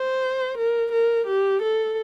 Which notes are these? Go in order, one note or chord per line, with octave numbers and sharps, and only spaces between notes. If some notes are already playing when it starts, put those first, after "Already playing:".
Already playing: C5
A#4
A#4
G4
A4